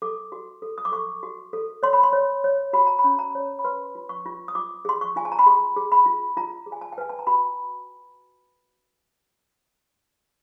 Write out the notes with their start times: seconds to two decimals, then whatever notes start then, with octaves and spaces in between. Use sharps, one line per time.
0.02 A4 D6
0.32 F#4
0.62 A4
0.78 D#6
0.85 D6
0.92 A4 C#6
1.23 F#4
1.53 A4
1.83 C#5 C6
1.93 B5
2.03 C6
2.13 C#5
2.44 C#5
2.73 F#4 B5
2.87 A#5
2.99 B5
3.04 C#4
3.19 A#5
3.35 C#5
3.59 B5
3.64 B4 C6
3.95 F4
4.09 C#6
4.26 F4
4.48 D#6
4.55 F4 D6
4.85 G#4 C6
5.01 C#6
5.16 F4 G#5
5.25 A5
5.32 A#5
5.39 B5
5.46 G#4 C6
5.77 G#4
5.92 B5
6.06 F4
6.37 F4 A#5
6.66 G#4
6.72 G#5
6.81 A5
6.92 G5
6.98 B4 G#5
7.09 A5
7.19 A#5
7.27 F#4 B5